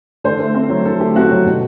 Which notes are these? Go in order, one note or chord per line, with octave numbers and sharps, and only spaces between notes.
D3 C5
A3
C4
F#3
D3 A4
A3 G4
C4 F#4
F#3
B2